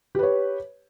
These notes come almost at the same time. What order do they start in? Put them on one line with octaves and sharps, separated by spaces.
G4 B4 C#5